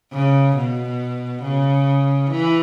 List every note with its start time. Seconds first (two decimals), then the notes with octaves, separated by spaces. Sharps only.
0.13 C#3
0.56 B2
1.43 C#3
2.31 E3